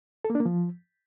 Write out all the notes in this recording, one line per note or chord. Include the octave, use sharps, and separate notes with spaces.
A4
A#3
D4
A#3
F3